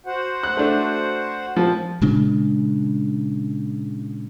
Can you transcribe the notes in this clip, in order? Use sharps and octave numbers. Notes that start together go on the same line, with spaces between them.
F#4 C5 F#5
F#6
A3 D4
A#2 F3 C4
A#2 C#3 G#3 D4